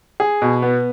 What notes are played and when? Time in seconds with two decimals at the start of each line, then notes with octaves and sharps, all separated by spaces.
0.20 G#4
0.42 B2
0.62 B3